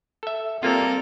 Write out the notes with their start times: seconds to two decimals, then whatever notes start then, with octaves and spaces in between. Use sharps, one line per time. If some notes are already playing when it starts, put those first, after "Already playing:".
0.23 A4 E5
0.63 G3 A#3 C4 F4 A4 A#4